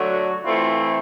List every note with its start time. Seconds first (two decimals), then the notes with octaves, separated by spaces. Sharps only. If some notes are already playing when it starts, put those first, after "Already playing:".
Already playing: D3 F#3 A3
0.09 F#4
0.44 E3 A3 C4 E4 F4